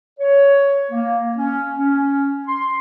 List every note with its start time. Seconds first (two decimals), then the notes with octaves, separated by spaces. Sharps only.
0.19 C#5
0.91 A#3
1.37 C#4
1.76 C#4
2.47 C6